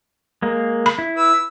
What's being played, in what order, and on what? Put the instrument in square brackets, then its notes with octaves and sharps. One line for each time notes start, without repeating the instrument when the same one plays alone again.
[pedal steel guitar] G#3 A#3
[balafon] B5
[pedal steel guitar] E4
[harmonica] B4 E6